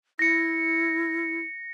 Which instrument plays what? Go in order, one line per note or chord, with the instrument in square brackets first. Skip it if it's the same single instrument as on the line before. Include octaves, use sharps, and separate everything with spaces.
[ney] E4 [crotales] A#6 C#7